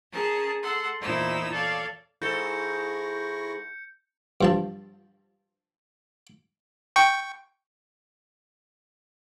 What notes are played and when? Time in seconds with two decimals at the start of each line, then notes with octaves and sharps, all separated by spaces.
0.11 C#4 G#4 A#4 A5
0.61 A4 F#5 C6
1.00 E2 A#2 D#4 E4 C5 E6
1.50 A4 C#5 D5 F5
2.22 G#2 E4 A4 C#6 G6 A#6 C#7
4.41 G2 F3 A5
6.96 G5 C#6